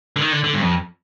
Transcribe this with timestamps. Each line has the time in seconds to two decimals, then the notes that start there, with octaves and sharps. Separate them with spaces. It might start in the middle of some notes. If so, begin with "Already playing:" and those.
0.16 D3
0.21 D#3
0.32 D3
0.44 D3
0.54 G2
0.62 F2